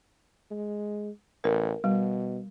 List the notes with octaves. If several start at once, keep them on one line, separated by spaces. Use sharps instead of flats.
G#3
A1 A#4
B2 G3